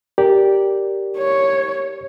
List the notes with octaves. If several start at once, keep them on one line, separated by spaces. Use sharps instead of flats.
G4 A#4 D5
C#5